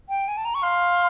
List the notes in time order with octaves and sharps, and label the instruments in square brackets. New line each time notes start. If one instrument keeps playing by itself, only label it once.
[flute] G5
G#5
A5
A#5
C#6
[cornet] F5 [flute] C6